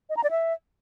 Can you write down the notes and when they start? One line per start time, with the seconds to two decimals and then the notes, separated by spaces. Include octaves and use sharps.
0.10 D#5
0.17 A#5
0.24 D5
0.31 E5